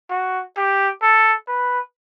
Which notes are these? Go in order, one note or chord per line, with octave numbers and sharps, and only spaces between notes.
F#4
G4
A4
B4